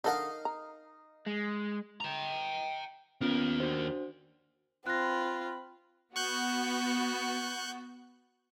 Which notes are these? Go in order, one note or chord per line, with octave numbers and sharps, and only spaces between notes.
D3 D#4 A4 A#4 F5 F#5
A#5
G#3
G5 A#5
D#2 B3 C#4 F4 A#4
D4 F#4 C5
C4 F4 B5 F#6 A#6
B3 F#4 C#6 F#6 G6